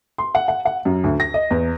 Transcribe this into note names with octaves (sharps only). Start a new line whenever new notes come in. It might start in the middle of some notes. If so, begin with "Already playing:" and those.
C6
F#5
F#5
F#5
F#2
D2
A#6
D#5
E2